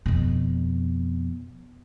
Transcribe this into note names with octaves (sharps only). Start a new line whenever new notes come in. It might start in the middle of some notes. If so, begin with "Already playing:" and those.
F2 B2